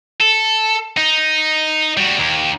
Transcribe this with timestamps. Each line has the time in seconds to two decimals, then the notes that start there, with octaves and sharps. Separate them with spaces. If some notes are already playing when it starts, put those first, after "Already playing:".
0.20 A4
0.97 D#4
1.97 G3 F#4
2.19 D#2